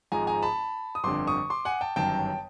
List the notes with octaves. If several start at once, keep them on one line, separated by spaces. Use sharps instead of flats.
G#1 G#2 F3 G#3 G#5 A#5
G#5 A#5
A5 B5
D#6
G1 F2 D3 C6 D6
C#6 D#6
C6 D6
F#5 G#5
G5 A5
G1 F#2 D#3 F#3 G5 A5